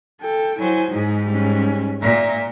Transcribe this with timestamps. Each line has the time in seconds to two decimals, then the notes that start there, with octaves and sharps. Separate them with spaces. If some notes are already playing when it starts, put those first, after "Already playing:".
0.21 A4 G5
0.58 F#3 E4 C5 G#5
0.91 G#2 D#4 G#4
1.25 G3 C#4
2.01 A#2 E5 A#5